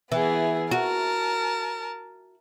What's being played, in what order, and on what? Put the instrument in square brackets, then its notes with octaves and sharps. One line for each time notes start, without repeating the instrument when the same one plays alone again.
[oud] E3 [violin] B3 G#4
[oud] F#4 [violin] A#4 A5